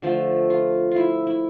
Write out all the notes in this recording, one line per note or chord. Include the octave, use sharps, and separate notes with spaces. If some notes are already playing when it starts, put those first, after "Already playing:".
D3 F3 A3
F4
E4 F4
E4